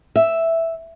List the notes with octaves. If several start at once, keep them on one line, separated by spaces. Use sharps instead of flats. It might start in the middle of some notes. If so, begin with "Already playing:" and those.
E5